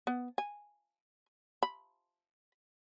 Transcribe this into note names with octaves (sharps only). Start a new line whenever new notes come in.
B3
G#5
B5